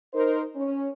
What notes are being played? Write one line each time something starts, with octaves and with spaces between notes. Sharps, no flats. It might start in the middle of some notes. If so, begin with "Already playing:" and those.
D#4 A#4 C5
C#4